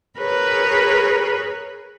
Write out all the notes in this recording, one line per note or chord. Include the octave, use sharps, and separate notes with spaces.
G#4 A#4 B4 C#5 B5